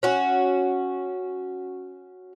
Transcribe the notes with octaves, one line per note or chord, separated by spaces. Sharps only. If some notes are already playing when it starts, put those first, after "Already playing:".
C#4 F#4